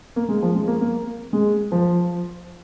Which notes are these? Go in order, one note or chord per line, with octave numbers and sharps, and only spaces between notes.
A#3
G#3
F3
G#3
A#3
A#3
G#3
F3